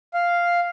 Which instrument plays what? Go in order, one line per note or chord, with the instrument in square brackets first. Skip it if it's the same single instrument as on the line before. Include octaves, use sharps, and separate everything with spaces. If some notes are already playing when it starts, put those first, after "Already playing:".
[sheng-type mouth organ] F5